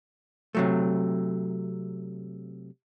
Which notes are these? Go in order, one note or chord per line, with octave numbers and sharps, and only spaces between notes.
C3 F#3 A3